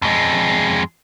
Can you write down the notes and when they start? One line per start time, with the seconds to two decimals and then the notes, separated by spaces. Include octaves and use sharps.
0.02 F2 G#3